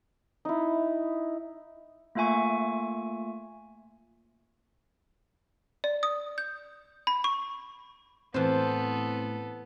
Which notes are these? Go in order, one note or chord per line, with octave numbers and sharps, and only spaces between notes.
D#4 E4
A3 A#3 F4 E5 G#5 C#6
D5
D#6
G6
B5
C#6
A2 E3 B3 C4 F4 A4 C5